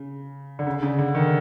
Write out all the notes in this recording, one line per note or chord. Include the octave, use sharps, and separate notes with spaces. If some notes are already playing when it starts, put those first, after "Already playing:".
Already playing: C#3
D3
C#3
C#3
D3
D#3